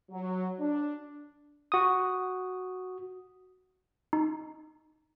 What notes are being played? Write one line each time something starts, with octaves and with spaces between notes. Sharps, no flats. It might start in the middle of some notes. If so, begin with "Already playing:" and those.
F#3
D4
F#4 D#6
D#4